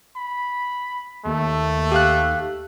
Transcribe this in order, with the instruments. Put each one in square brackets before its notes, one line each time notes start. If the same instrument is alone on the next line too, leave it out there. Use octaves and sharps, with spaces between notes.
[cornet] B5
[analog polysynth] D#2 [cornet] A3
[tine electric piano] G4 F5 F#6